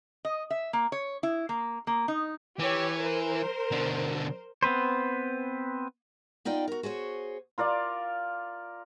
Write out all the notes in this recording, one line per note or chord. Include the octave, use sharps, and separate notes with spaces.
D#5
E5
A#3
C#5
E4
A#3
A#3
D#4
E3 G4 C#5
A#4 C5
B2 D3
B3 C4 B4 C5
B3 D#4 F4 D5 G5
F#4 A#4
F#4 G#4 C5 C#5
F4 A#4 D5 F5